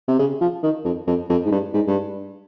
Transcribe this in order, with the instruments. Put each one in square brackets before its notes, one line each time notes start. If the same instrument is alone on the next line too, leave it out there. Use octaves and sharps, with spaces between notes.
[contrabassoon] C3
C#3
F3
D#3
F2
F2
F2
G#2
G2
G#2
G2